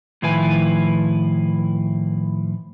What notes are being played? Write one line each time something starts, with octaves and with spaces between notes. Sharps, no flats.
A2 D#3 F3 E4 B4 G#5